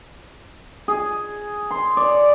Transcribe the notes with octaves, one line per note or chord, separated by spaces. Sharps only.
G#4
C6
D5